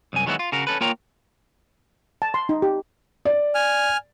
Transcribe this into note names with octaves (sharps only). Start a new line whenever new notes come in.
C2 F#2 G#5
D#3 F#3 G#3 B3 E4 F#4
F4
C#3 F#4 A#4
C#4 A4 B4
A#3 F4 A#4 C#5 G5 A#5
A5
C6
D#4
G4
D5
G#5 F6